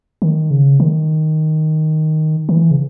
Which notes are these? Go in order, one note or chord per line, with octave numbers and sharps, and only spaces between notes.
D#3
C#3
D#3
D#3
E3
C#3